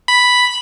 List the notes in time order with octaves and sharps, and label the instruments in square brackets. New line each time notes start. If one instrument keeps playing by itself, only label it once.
[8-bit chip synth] B5